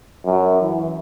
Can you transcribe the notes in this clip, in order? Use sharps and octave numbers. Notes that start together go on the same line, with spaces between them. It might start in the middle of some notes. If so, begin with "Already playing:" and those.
F#2
E3